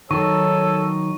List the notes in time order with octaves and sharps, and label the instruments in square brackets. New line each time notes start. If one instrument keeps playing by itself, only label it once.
[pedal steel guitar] D#3 F#3 D#4 [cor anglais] A4 [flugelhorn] C#5 [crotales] C#6